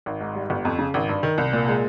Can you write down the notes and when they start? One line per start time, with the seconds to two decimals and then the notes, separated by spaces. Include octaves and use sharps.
0.06 G#1
0.21 G#2
0.35 G3
0.50 G1
0.65 F2
0.79 C#3
0.94 G#1
1.09 G2
1.23 D#3
1.38 C2
1.53 A#2
1.68 G#3